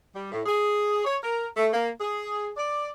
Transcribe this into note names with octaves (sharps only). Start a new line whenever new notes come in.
G3
A2
G#4
C#5
A#4
A3
A#3
G#4
D5